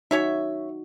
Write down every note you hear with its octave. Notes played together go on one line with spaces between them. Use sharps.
C#4 D#4 F#4 C#5 E5